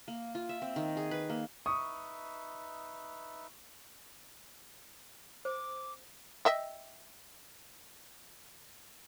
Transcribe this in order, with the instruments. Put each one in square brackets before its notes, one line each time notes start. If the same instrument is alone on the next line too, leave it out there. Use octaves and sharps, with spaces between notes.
[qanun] A#3
F4
E5
C4
D#3
G#4
B4
A#3
[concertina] D#4 B4 E5 [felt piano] C#6 [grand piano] D#6
[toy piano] C5 [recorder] D6
[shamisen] D#5 E5 G5